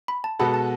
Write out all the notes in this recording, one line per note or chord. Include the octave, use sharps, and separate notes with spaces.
B5
A5
B2 G#3 B3 F#4 A4 B5
A5